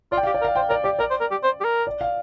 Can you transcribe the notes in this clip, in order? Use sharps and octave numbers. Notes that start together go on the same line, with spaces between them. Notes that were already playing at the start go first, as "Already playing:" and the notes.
F4 D5
G5
G4 F5
D5
A#4
F5
C5 G5
A#4 D5
G4 D5
A#4 D5
C5
A#4
G4
C5
G4
A#4
D5
F5